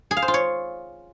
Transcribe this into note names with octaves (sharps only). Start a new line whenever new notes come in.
G#4
F5
C5
F4
C#5